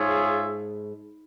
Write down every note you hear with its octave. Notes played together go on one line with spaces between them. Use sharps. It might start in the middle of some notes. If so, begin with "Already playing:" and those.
Already playing: G#2 F4 G#4 C#5 E5